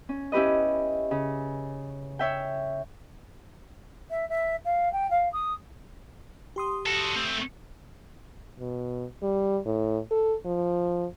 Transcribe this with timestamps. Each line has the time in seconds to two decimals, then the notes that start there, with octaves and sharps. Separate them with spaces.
0.09 C#4
0.32 C#4 E4 G4 B4 D#5
1.11 C#3
2.19 C#5 E5 G5
4.10 E5
4.29 E5
4.65 F5
4.92 G5
5.10 F5
5.33 D#6
6.56 G4 C6 D#6
6.86 F#4 A4
7.16 A3 C4
8.60 B2
9.23 G3
9.65 A2
10.11 A4
10.45 F3